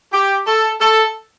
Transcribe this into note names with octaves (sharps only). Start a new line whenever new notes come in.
G4
A4
A4